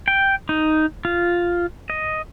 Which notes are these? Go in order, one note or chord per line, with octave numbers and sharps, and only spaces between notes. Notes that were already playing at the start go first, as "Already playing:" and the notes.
G5
D#4
F4
D#5